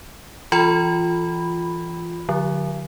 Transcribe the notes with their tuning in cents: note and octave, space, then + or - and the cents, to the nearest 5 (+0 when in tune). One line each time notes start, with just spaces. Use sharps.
E3 +20 F4 +0 B5 +0
D3 +0 F#3 -45